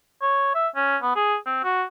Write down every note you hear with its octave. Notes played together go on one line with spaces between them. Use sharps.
C#5
E5
C#4
B3
G#4
C4
F#4